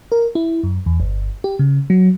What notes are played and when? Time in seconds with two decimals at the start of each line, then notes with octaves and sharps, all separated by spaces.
0.12 A#4
0.35 E4
0.64 F#2
0.86 E2
1.00 G1
1.44 G4
1.59 C#3
1.90 F#3